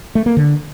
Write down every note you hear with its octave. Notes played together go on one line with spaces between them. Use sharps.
A3
A#3
D3